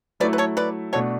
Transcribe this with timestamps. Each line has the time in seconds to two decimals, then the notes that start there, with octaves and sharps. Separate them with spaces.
0.20 F#3 A3 E4 B4 D5
0.33 B4
0.38 A4 C#5
0.57 B4 D5
0.93 B2 A3 D4 F#4 A4 C#5